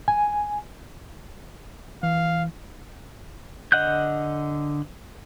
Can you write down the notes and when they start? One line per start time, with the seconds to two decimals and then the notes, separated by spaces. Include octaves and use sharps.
0.08 G#5
2.03 E3 F5
3.72 D3 D#5 F#5 F#6 G6